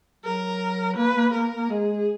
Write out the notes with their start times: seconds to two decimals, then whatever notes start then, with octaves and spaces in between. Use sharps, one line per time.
0.24 F#3 A#4
0.97 A#3 B4
1.17 A#3
1.34 A#3 A#4
1.56 A#3
1.70 G#3 G#4